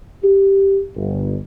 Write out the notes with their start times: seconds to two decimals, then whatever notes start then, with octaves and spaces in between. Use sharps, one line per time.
0.23 G4
0.95 G1